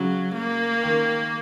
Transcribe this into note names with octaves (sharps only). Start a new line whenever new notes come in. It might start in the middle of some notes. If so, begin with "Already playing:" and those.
Already playing: C#3 F#3
A#3
D#3